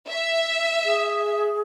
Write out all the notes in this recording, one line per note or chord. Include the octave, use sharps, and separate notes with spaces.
E5
G#4